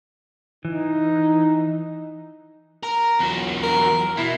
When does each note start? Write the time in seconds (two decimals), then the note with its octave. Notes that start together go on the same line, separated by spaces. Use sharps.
0.65 E3 D#4
2.83 A#4
3.19 E2 F#3
3.63 A#4
4.17 B2 E4